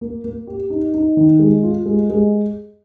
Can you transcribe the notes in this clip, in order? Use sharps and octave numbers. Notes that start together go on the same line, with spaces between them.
A#3
A#3
G4
D#4
D#4
D#3
G#3
F4
G#3
G#3